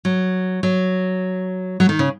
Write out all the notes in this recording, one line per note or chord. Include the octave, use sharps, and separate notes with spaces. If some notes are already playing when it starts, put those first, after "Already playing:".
F#3
F#3
F#3
D#3
C#3